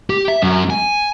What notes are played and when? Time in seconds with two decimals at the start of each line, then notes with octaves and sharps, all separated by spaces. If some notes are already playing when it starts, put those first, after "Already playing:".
0.10 G4
0.28 E5
0.43 F#2
0.70 G#5